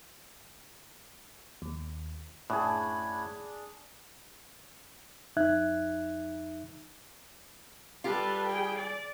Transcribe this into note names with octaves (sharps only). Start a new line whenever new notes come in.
D#2
F#2 A2 D4 G#4 B5 G#6
F2 D#4 E5 F#6 G#6
G3 F4 G4 A4 B4
G#4 G5
D5